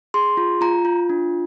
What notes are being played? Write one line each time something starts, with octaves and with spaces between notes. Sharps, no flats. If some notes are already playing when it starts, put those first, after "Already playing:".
G#4 C6
F4
F4 A#5
F4
D4